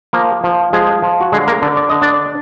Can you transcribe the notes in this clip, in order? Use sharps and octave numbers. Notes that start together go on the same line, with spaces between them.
F3 A#3 A#4
F3
F3 G#3 G#4
F3
F#4
D3 G#3 G#4
A#3 A#4
D3 D4 D5
D5
D3 D#5
D4 D5